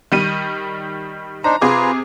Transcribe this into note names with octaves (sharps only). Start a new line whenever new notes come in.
D#3 G3 D#7
D4 D#4 C5 A#5
C3 F4 G#4 B4 A#5 D6